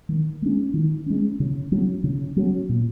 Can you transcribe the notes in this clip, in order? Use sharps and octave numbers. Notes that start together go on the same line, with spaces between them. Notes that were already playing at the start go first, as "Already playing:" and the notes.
D#3
G#3 C#4
D#3
G#3 C#4
C#3
F#3 C#4
C#3
F#3 C#4
A#2